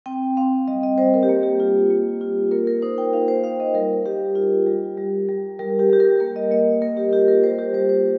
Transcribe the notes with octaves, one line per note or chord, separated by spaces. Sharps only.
C4 G5
C4 F5
G3 D#5
D#5
G3 C5
A#4
G4
A#3
G4
F4
A#3
F4
A#3 A#4
A#4
D#4 C5
G5
D#4 F5
C5
D#4 F5
D#5
G3 A#4
G3 G4
F4
G3
G3
G3
G3 A#4
G4
G3 G4
A#4
A#3 A#4
D#5
A#3 D#5
A#3 A#4
G4
F4 G4
A#4
G3 C5
G4
G3 C5
C5